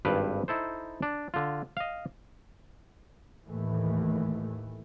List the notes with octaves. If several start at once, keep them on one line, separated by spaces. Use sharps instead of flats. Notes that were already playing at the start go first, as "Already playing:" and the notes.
G#1 G2 B4 F5 G5
D#4 E4 A4 C5
D4
D3 F4
D#5 F5
D#2 A2 E3 A3